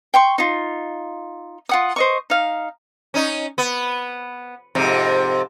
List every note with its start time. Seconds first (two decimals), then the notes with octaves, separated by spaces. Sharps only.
0.14 G5 C6 C#6
0.38 D#4 F4
1.69 F4 F#5 D#6
1.96 C5 D#5 C#6
2.30 D#4 F5
3.14 C#4 D#4
3.58 B3
4.75 F2 G#2 C3